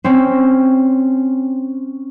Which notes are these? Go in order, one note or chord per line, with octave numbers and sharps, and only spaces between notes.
C4 C#4